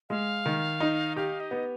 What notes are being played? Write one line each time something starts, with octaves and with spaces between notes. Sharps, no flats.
G#3 F5
D#3
D#4
G4 F5
D#5
B3